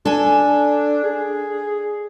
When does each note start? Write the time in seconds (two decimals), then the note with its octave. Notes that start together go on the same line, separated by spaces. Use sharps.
0.05 D4 A4 G#5
1.04 G#4